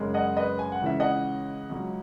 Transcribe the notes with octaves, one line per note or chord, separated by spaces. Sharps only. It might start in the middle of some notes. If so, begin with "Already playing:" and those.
Already playing: F#2 C#3 G#3
D#5 F#5
B4 D#5
G#5
F#5
C#2 C#3 E3 E5
D#5 F#5
C#2 C#3 F#3